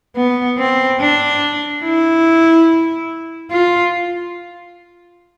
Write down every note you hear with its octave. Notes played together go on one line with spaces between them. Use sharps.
B3
C4
D4
E4
F4